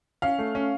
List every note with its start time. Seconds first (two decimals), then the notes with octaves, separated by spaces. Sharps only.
0.22 C#4 F5
0.39 A3
0.55 C#4